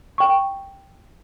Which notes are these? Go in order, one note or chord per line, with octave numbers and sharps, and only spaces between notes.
G5 C#6